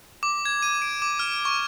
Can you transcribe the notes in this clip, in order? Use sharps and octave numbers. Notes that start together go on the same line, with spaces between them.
D6
G#6
D#7
D7
D6
F6
C#6